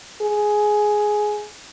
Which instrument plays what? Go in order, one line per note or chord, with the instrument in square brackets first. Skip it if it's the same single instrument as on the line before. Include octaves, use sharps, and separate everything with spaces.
[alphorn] G#4